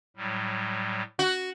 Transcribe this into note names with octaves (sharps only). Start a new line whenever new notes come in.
A2 F#3 G3
F#4